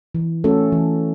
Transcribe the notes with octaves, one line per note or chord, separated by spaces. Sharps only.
E3
A3 C#4 F#4 A4
E3